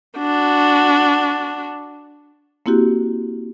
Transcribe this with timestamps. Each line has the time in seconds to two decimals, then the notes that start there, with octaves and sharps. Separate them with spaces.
0.18 D4 F#4
2.66 A#3 C4 E4 F#4 G4